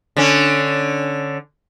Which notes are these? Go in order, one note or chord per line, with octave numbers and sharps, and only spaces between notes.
D3 C#4